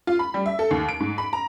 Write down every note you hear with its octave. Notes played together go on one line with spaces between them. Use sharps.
F4
B5
G3
E5
A4
D#2
D7
G#2
B5
A#5